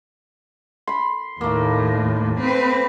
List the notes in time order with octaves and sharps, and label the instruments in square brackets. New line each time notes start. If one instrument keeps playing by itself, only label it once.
[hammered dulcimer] B5 C6
[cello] D#2 A2 [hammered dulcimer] A3 A#3
[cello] C4 B4